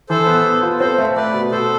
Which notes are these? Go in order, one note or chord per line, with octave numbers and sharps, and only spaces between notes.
E3 A4 C5
B3
B3
F4
C4 A4 C5
A3
A3 B4 D5
B2
B2 A4 C5